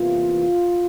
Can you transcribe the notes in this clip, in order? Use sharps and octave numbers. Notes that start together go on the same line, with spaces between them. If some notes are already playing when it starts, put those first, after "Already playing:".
Already playing: E2 C3 E3 A#3 F4